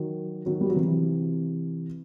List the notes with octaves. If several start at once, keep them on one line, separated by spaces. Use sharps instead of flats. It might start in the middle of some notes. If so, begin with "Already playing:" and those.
Already playing: D#3 F#3
D#3 F#3
G3
F#3
C3 E3